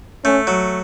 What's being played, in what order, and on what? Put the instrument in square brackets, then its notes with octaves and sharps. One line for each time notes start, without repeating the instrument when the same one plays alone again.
[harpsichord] A3 [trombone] C#4
[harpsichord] F#3